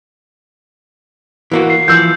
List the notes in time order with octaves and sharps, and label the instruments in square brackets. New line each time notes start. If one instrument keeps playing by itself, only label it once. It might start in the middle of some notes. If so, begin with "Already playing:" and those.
[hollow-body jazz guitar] E3 A#3 F#4
[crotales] C7
[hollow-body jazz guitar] E3 F3 [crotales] E6 G6